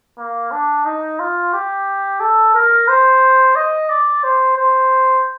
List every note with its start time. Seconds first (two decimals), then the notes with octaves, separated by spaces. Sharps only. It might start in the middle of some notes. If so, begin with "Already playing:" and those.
0.18 A#3
0.52 D4
0.85 D#4
1.19 F4
1.53 G4
2.20 A4
2.54 A#4
2.88 C5
3.56 D#5
3.89 D5
4.24 C5
4.57 C5